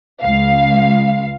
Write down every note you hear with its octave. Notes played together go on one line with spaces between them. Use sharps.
C#2 F5